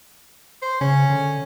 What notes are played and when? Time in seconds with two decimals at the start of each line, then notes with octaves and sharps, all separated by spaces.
0.62 C5
0.81 C#3 C#4
1.10 D3